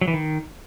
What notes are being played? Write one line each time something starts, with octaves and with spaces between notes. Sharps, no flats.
F#3
E3
D#3